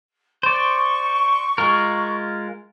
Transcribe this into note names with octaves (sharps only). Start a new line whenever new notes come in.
C5 D5 C#6
G#3 F4 A#4